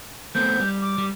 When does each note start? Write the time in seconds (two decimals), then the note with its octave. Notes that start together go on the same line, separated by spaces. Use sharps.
0.35 A3 B3 C4 G6
0.59 G3
0.82 D6
0.98 G3